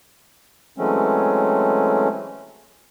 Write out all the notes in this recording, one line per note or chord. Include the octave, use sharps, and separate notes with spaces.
E3 F#3 G#3 A3 C4 C#4